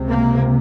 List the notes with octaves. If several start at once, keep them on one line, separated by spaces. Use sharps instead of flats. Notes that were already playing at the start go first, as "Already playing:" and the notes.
Already playing: C#2 C3
A#3